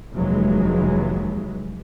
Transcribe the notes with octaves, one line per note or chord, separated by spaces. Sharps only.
F1 D#2 E3 F#3 G#3